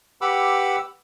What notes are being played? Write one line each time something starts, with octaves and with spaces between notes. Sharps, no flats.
G4 B4 F#5 B5 D6 E6